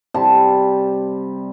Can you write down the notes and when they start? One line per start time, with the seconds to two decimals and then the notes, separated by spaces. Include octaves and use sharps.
0.14 C3 G3 A5